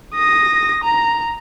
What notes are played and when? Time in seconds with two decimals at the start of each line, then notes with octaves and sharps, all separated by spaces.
0.15 D#6 A#6
0.84 A#5